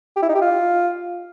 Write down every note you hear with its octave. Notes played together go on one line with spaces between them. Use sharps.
G4
E4
D#4
G4
F4